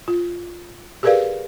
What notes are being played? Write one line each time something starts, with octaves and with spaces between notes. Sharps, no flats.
F4
G4 G#4 A#4 B4 D5 F5